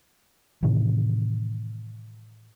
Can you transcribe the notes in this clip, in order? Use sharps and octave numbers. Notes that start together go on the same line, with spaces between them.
A2 C3 D#3 E3